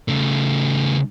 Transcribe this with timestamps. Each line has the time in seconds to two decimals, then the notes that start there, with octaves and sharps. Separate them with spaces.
0.08 C#3 A3